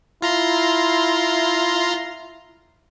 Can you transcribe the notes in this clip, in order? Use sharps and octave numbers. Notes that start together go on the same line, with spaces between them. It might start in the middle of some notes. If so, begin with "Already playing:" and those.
E4 F4 A#5 C6